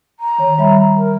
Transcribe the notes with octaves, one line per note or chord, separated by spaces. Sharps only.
A#5
D#3 C#5
G3 E5 B5
A#4